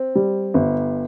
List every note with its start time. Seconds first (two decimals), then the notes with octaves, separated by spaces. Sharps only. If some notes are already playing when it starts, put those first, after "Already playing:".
Already playing: C4
0.15 G3
0.54 G1